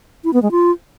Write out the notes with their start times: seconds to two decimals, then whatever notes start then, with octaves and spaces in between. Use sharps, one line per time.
0.24 E4
0.33 B3
0.42 G#3
0.51 F4